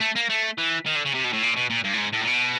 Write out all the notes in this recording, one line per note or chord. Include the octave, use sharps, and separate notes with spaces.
A3
A#3
A3
E3
D#3
D3
C#3
C3
B2
A2
A#2
B2
A#2
G2
A2
G#2
A2
A#2
B2